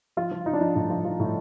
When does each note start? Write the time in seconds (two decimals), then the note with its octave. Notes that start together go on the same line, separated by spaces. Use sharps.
0.17 F3 F4
0.31 F3
0.46 F3 D#4
0.53 D4
0.61 F3 D#4
0.75 A2 D4
0.90 F3
1.05 F3
1.20 A2